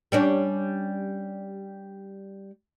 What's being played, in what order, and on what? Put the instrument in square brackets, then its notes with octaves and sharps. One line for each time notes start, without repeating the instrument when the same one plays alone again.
[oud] G3 C#4 D4